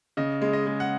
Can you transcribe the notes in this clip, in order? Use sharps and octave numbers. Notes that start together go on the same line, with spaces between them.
C#3 D#5
G#3
D#5
G#3
F#5